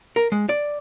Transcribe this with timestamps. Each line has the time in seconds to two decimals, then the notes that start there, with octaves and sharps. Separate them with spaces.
0.16 A#4
0.32 G#3
0.49 D5